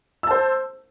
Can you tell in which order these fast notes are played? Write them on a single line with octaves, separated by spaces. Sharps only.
E6 A5 C5